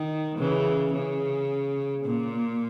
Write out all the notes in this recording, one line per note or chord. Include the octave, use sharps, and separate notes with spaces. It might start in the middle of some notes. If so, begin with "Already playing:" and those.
Already playing: D#3
C#3 E3
C#3
A#2